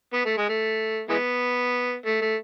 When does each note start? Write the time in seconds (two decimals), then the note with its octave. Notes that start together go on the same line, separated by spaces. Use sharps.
0.13 B3
0.25 A3
0.37 G#3
0.49 A3
1.09 E3 G#3 B3
2.06 A3
2.21 A3